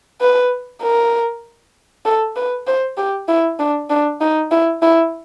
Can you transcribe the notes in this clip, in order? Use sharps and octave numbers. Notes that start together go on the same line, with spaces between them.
B4
A#4
A4
B4
C5
G4
E4
D4
D4
D#4
E4
E4